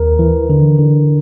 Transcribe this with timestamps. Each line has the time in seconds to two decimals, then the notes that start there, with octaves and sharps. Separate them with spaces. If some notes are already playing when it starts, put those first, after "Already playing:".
Already playing: D#2 A#4
0.19 E3
0.50 D3
0.79 D3